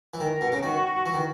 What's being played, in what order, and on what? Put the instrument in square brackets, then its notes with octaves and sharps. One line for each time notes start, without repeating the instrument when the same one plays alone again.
[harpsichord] E3
[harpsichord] D#3 [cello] A#4
[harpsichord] B2
C#3
[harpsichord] D#3 [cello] F#4
[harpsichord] E3
D#3